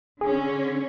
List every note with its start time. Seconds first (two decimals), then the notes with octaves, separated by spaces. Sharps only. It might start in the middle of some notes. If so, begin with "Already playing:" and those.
0.21 D3 C#4 G#4